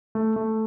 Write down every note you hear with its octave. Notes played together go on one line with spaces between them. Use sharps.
A3
A3